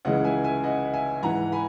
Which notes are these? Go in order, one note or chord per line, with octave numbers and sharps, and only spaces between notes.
C#2 C#3 E3 D#5 F#5
E5 G#5
E5 G#5
D#5 F#5
E5 G#5
G#2 E3 F#5 A#5
G#5 B5